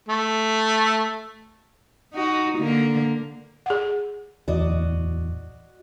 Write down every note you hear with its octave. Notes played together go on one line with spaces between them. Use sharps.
A3
D#4 F#4
D3 A#3
G#4 F#5
D1 E2 F#4 D5 D#5